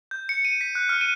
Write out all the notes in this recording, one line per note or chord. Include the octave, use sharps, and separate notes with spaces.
G6
C#7
D#7
B6
F#6
F6
D#7